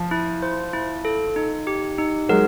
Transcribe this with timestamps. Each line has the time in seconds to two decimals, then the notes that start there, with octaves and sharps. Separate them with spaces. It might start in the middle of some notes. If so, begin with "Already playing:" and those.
Already playing: F3
0.11 E4
0.43 C5
0.73 E4
1.05 A4
1.36 D#4
1.67 G4
1.98 D#4
2.29 F#3 G#3 A#4